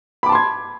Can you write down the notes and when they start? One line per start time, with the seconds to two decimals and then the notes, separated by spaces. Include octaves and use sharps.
0.23 B5
0.26 D6
0.29 A5
0.32 C6
0.35 G#6